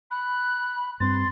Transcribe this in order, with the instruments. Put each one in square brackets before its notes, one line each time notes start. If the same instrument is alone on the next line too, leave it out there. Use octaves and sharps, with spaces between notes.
[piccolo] B5 [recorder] F#6
[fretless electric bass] G2 C4 [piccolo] C6 [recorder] A6